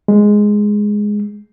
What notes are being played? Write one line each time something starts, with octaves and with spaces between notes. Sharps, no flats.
G#3